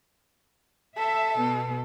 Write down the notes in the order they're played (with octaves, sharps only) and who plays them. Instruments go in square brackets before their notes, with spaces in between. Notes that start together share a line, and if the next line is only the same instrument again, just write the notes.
[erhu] A4 [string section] E5
[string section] B2